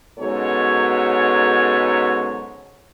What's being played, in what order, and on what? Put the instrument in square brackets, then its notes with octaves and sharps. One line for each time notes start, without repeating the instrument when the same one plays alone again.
[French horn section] G#2 B2 F#3 C#4 A4 C#5